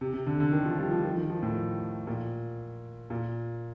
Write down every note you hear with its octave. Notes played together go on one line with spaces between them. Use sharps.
C3
C3
D3
D3
D#3
F3
G3
F3
D#3
D#3
F3
A2
A#2
A#2